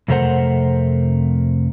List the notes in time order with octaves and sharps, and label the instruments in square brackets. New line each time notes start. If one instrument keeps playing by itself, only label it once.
[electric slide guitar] F2 C3 A3 A#4 C5 F#5